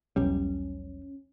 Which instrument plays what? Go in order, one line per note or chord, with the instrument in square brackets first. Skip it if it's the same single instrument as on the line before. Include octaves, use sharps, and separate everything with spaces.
[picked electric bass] E1 B1 G3 [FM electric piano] C#4